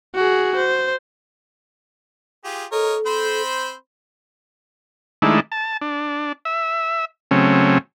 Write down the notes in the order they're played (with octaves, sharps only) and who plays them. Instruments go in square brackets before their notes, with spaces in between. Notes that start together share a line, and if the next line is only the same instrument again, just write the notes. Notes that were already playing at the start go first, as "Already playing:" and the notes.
[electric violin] F#4 G#4
C5
[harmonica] F4 G4 G#4
[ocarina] A4 [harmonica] A#4 C#5 D#5
[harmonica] C4 C5 B5
[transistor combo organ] D#3 G#3 A3 D4 E4
A5
D4
E5
C#3 F#3 A3 C4 C#4